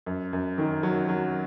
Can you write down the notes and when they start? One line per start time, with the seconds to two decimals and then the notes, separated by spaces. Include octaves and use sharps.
0.06 F#2
0.33 F#2
0.58 D#3
0.83 F#3
1.09 F#3